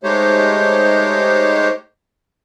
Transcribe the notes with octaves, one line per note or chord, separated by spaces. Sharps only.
G#3 A3 D#4 G4 C5 C#5